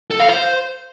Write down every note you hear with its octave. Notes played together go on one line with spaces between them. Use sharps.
A4
F5
C5